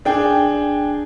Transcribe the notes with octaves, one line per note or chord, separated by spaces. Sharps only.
D4 G#4 G5